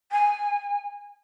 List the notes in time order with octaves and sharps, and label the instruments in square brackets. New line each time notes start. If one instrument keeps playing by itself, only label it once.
[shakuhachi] G#5